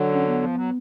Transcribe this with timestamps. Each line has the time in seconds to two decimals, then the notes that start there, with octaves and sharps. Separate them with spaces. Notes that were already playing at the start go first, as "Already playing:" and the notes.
Already playing: D3 F#3
0.13 C#4
0.27 B3
0.42 F3
0.56 F#3